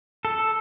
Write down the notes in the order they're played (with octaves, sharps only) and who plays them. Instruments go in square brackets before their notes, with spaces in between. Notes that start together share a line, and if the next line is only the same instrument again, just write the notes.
[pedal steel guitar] A4